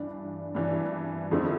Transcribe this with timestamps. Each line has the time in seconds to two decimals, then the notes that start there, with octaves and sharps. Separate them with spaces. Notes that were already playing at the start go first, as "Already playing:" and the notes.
Already playing: G2 E3 G3 D4
0.55 G2 E3 G3 D4
1.31 F2 D3 A3 C4 E4